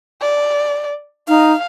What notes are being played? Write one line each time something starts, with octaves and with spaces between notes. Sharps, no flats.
D5
D#4 F5